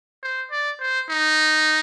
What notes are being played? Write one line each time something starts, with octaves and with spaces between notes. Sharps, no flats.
C5
D5
C5
D#4